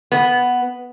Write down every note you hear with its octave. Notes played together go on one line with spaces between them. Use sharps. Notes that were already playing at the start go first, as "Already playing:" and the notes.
B3